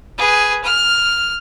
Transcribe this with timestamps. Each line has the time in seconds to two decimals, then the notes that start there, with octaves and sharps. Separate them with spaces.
0.18 G#4 B4
0.63 F6